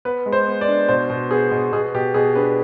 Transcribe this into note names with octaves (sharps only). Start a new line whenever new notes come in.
B3 B4
G#3
C5
B3
D5
D4
B2 C5
B2
B3 G#4
B2
B2 G#4
B2 G4
B2 G#4
D4 B4